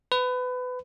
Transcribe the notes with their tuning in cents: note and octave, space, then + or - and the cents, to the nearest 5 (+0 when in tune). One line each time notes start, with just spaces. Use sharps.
B4 +25